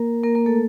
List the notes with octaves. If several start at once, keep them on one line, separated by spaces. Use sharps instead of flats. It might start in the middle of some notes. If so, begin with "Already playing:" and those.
Already playing: A#3 A#4
A#3 A#4
A#3 A#4
A3 A4